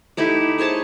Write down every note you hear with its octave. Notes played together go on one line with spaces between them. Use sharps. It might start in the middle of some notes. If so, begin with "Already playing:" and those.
A3 D#4 E4 G4
G#4 C5 C#5 A5